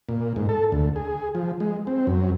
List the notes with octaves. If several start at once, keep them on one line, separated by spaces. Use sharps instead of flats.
A#2
G#2
A4
D2
G#4
F3
G#3
C4
F#2